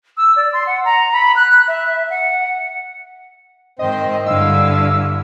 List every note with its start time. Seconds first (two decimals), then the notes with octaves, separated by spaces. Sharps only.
0.17 E6
0.36 D5
0.53 C6
0.67 F#5
0.85 A#5
1.13 B5
1.36 F#6
1.68 E5
2.10 F#5
3.79 G#2 D#3 C4 C5 D#5
4.26 G2 D3 E4 F5 E6